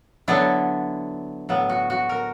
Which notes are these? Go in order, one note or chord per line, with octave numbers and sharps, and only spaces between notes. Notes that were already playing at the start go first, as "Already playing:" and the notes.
D3 F#3 B3 D4 E4
A2 F#3 B3
F#4
F#4
A#4